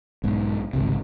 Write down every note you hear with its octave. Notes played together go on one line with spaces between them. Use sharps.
B1 G#2
G#1 C#2 C3